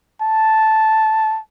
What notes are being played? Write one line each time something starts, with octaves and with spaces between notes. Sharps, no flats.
A5